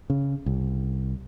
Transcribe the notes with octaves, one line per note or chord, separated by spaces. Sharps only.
C#3
C2